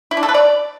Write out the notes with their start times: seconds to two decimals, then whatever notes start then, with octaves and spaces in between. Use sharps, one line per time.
0.11 E4
0.17 D4
0.23 A4
0.29 B4
0.34 D5